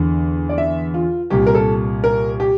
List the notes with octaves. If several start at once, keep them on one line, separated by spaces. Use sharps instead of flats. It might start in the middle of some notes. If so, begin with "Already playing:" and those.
Already playing: E2 D3
D5
E5
F4
C2 A#2 G4
A#4
A4
A#4
G4